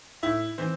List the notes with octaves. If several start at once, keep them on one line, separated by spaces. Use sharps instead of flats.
A2 E4 E5
E3 C4 C5